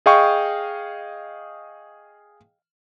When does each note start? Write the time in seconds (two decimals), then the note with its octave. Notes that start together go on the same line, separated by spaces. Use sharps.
0.06 G#4 D#5 F5 G5 C#6